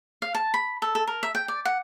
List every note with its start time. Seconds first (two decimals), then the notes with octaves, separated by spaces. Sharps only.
0.22 F5
0.35 A5
0.54 B5
0.82 A4
0.95 A4
1.07 A#4
1.23 E5
1.35 G5
1.48 D5
1.65 F#5